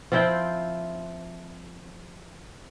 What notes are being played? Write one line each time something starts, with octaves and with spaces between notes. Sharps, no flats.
F3 C4 E4 G5